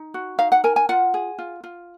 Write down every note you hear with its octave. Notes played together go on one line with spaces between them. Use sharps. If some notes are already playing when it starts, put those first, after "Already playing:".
Already playing: D#4
F#4
D#4 F5
F#5
A#4 G#5
G#5
F4 F#5
G#4
F4
F4